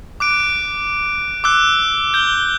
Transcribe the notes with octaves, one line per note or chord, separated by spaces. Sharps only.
D6 F#6 D7
D6 E6 F#6
G6 G7